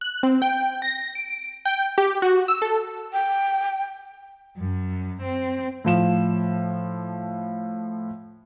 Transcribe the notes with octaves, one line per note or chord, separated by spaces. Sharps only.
F#6
C4
G5
A#6
D7
G5
G4
F#4
E6
A4
G5
F#2
C4
A2 F3 E7